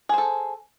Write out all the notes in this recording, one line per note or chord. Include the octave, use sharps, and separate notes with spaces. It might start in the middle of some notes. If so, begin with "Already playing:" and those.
G#4 A4 C5